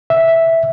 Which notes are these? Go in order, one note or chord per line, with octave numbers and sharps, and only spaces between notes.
E5